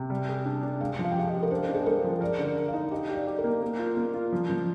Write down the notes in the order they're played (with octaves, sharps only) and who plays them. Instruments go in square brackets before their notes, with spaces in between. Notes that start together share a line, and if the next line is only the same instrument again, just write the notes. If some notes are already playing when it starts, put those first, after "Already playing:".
Already playing: [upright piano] C3
G3
G#4
D4
D4
[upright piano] G#3 [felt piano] F5
[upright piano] F3
[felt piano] F5
G5
[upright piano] G4 [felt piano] F5
[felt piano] D#5
[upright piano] G4
[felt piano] A#4
[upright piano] D4 [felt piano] C5
[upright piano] D4
[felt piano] G#4
[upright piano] G#3 [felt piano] A#4
[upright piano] F3
[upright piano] A#4 [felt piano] D5
[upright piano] D3
[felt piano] D5
[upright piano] A#4
[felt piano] F5
[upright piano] D#4
[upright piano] G4 [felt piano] D#5
[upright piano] G4
[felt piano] D5
[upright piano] G4
[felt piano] A#4
[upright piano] A#3
A#3
F4
A#3
F4
F3
F3